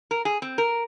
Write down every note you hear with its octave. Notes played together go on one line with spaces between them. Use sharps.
A#4
G#4
C4
A#4